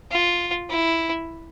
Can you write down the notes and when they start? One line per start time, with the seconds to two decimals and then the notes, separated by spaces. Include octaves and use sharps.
0.11 F4
0.70 E4